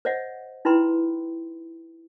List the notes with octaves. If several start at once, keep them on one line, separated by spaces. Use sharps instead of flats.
C5 C#5 D#5 E5 F#5
D#4 E4 B4 G5 B5 C6